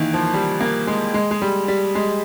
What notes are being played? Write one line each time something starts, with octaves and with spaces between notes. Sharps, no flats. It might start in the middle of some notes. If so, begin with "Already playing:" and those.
Already playing: D#3 E3 A#3
F3
G3
A#3
G#3
G#3
G#3
G3
G3
G#3